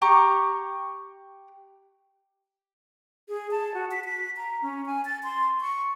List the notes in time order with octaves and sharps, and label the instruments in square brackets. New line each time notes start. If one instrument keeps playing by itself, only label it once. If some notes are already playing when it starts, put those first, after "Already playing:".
[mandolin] G4 A#5 C#6
[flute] G#4
A5
F#4
B6
B6
A#5
C#4
G#5
A6
C6
C#6